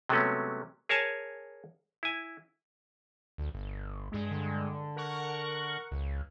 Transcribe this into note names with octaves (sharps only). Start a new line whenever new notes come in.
C3 F#3 G#3 A3 B3 C#4
G#4 A#4 C#5 G#5 A5
E4 G#5
D2
G1
G2 G#3
D3
A#4 F#5 C#6
C#2